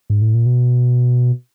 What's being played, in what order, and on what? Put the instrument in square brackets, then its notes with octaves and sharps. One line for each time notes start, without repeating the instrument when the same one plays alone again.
[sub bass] G#2
A2
A#2
B2